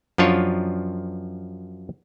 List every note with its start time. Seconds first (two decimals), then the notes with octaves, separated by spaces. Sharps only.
0.18 F#2 F3 D4 F4 C#5